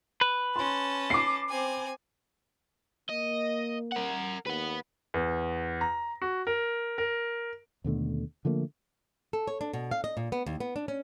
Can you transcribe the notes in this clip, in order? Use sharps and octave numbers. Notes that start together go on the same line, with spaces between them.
B4
C#4 A5 C6
D6 C7
C4 G#5
A#3 D#5
A#4 F#5
D#2 B4 F#5
E2
A#5
F#4
A#4
A#4
D#2 B2 D3 A3
D3 F3 A3 A#3
A4
C#5
D4
B2
F5
D#5
A#2
B3
D#2
B3
D4
C#4